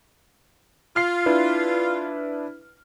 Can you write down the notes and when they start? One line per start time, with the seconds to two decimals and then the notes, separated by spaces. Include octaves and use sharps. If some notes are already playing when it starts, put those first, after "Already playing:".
0.96 F4 F6 C7
1.26 D4 E4 B4